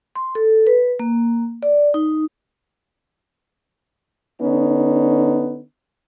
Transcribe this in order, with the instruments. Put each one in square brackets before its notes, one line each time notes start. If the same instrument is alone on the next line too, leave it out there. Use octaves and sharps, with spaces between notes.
[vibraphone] C6
A4
B4
A#3
D5
D#4
[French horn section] D3 B3 C#4 D#4